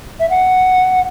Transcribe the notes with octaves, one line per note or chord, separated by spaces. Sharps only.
E5
F#5